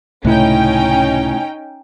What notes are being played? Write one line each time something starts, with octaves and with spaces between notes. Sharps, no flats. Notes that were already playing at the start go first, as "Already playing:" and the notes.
C#2 A2 C3 A3 C#4 D#4 E4 G5